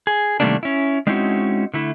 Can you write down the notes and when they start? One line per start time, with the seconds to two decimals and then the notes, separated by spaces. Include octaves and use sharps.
0.07 G#4
0.40 C3 D#3 G3 A3 A#3 D4
0.63 C#4 E4
1.07 G#3 C4 C#4 D#4 E4 F#4
1.74 D3 A3 E4